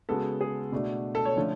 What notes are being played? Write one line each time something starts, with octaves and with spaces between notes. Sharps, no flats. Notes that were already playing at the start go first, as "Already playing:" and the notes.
C#3 G#3 B3 F#4 A4
G#4
B2 A3 D4 F#4
A4
C#5
D3 F3 A3 C#4